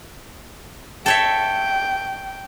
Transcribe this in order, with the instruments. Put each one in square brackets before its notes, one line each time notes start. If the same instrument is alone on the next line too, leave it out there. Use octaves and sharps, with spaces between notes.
[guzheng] A4 C#5 E5 [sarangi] G5